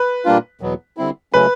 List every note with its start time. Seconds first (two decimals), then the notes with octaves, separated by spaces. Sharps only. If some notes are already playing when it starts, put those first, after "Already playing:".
Already playing: B4
0.25 A#2 G3 A#3 D4 F4
0.61 E2 B2 F#3 B3
0.97 D3 G3 C4 E4
1.33 C#3 F#3 A3 C#4 B4